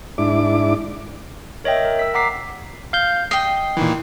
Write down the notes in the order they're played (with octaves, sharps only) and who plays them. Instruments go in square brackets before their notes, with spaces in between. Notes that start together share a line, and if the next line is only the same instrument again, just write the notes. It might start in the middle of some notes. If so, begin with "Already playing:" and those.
[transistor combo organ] G#2 D4 E4 D6
[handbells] A#4 C#5 D#5 E5 G5
A#4
E6 B6
F#5 A#5 D6 B6 C7
[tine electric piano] F5 G6
[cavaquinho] D#5 G5 [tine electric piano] C7
[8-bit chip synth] A#2 D#3 E3